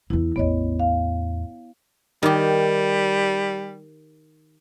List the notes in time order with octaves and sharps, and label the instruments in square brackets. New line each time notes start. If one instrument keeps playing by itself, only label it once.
[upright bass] E2 E3 [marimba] E4
[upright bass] A1 E2 [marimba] B3 C#5 D#5
[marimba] F5
[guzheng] D#3 G4 [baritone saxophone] G3